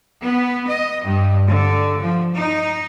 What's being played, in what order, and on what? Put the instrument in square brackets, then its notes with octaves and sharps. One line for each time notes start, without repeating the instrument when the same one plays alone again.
[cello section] B3
D#5
G2
D3
F3
D#4